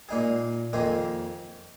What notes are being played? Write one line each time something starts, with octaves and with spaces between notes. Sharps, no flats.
A#2 A#3 D#4 G#4
F2 D#3 A#3 D#4 G#4